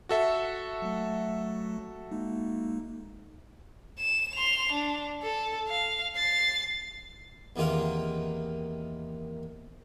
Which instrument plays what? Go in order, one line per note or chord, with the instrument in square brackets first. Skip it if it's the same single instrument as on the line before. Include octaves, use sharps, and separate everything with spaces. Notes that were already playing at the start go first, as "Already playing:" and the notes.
[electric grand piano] F#4 A4 E5
[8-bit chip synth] F#3 A3
G#3 A#3 D#4
[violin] E7
C6 F7
D4
A4
F5
A6 C7
[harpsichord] E2 C3 D#3 A#3 F4 A#4